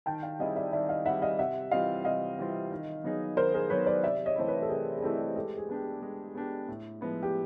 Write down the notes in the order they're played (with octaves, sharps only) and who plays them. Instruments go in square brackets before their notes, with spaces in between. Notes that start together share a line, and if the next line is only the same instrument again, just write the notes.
[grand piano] D#3 [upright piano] G5 A5
[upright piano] F5 G5
[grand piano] G3 C4 E4 G#4 [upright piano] D#5 F5
[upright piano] D5 E5
[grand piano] D#3 [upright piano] D5 E5
[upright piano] D#5 F5
[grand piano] G3 C4 E4 G#4 [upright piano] E5 F#5
[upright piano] D#5 F5
[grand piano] C3 [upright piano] E5 F#5
[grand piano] E3 G3 C4 F4 [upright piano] D#5 F5
[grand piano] C3 [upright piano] D#5 F5
[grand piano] E3 G3 C4 F4
D#3
F#3 B3 D#4 G#4
[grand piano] D#3 [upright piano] A#4 C5
[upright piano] G#4 A#4
[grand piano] F#3 B3 D#4 G#4 [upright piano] B4 C#5
[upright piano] C5 D5
[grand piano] C3 [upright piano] D5 E5
[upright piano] C#5 D#5
[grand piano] E3 A3 C4 E4 [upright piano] C5
[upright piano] B4 C#5
A4
[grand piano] C3 [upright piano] G#4 A#4
[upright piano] G#4
[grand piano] E3 A3 C4 E4 [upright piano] G4 A4
[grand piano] G#3 [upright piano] G4 A4
[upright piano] G#4
[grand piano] B3 D4 G4
G#3
B3 D4 G4
A2
F3 G#3 B3 E4
[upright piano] G4